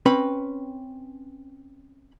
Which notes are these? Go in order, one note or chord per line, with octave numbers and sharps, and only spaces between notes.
C4 C#4 B4 B5